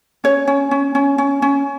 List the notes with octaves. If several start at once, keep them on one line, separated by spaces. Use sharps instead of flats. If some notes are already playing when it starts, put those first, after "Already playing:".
C#4 C#5
C#4
C#4
C#4
C#4
C#4